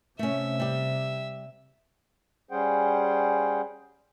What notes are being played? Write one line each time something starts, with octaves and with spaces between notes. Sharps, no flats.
C3 A3 C#4 E5
G3 G4
G3 C#4 G#4 C5 F#5 G5